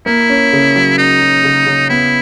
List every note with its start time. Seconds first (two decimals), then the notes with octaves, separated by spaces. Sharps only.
0.06 A#3 E4
0.30 C#4
0.53 C#3
0.76 F#3
0.98 C#4 D#4
1.21 F#3
1.44 C#3
1.66 C#3
1.89 B3 E4